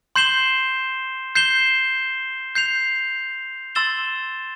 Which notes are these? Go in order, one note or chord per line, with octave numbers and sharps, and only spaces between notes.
C6 G6 C7 E7 G7
G6 C7 E7 G7
G6 C7 F7
C6 E6 A6 E7 G7